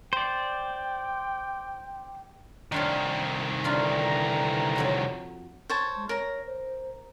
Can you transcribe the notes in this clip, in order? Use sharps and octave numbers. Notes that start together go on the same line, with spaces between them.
C5 D5 G5
C2 D#3 D4 F4 A#4
D3 E3 D4 F4 A#4 A#5
F2 F#3 F#5
C5 C#5 A5
G#3
A#4 C#5 A#5
C5